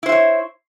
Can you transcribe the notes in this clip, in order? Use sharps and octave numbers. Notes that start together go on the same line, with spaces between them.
E4 C5 C#5 E5